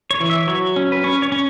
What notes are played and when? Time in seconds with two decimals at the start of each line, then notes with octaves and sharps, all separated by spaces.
0.11 C#5
0.20 E3
0.30 E5
0.47 F#3 C#5
0.76 C#4
0.92 B4
1.04 C#4 C#5
1.22 C#5
1.32 C#4